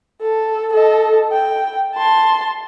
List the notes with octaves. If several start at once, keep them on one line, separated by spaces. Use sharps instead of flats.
A4
A4 D#5
G5
A5 C6